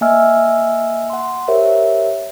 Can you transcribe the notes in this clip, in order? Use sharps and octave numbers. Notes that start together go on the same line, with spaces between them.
A#3 D#5 E5 G#5 E6 F6
F#5 C6
G4 A#4 C5 C#5 E5